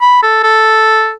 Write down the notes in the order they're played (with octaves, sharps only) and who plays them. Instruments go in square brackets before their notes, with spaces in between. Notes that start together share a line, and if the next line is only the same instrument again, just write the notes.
[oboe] B5
A4
A4